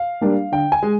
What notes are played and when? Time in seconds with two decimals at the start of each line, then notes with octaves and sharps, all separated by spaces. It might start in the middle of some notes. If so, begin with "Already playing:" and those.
Already playing: F5
0.21 G3 A#3 D4
0.52 D3 G5
0.72 G#5
0.83 G#3